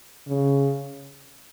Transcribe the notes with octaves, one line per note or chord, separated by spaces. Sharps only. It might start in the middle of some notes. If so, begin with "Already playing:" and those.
C#3